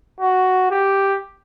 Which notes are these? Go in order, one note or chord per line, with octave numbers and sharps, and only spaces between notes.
F#4
G4